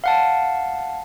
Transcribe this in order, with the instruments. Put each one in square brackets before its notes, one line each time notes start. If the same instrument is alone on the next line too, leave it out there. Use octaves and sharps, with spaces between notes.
[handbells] F5 F#5 A5